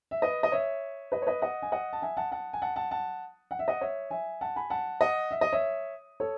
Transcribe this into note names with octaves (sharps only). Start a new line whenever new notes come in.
E5
B4 D#5
D#5
C#5 E5
B4 D#5
C#5
B4 D#5
D#5 F#5
G#5
D#5 F#5
A5
E5 G#5
F#5 A5
F#5 A5
G#5
F#5 A5
F#5 A5
F#5 A5
F#5
E5
D#5 F#5
C#5 E5
E5 G#5
F#5 A5
G#5 B5
F#5 A5
D#5 F#5
E5
D#5
C#5 E5
A4 C#5